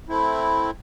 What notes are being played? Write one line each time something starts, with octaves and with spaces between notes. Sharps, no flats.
A3 C4 E4